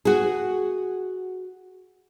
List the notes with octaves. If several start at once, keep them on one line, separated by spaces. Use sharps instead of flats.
F#4 G#4